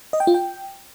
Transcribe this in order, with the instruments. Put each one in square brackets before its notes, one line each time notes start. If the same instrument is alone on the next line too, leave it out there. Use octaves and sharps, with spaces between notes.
[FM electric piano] D#5
G5
F4
G5